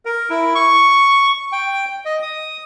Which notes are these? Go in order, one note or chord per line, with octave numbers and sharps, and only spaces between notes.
A#4
E4
C#6
G5
D#5
D#6